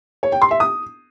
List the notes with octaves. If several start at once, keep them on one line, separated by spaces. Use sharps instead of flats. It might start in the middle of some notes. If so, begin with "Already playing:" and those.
C#5
G5
C6
E5
D#6